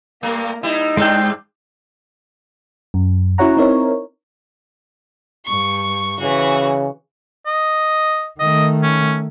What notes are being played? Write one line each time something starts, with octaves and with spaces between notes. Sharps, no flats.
G2 A3 A#3
G3 D#4 E4
G2 G#3 C4 D4 G5
F#2
C#4 E4 F#4 C#5 F#5 A#5
C4 D#4 E4 A#4 C#5
G2 C#6
C#3 E3 F#4
D#5
D#3 A3 D#5
C#4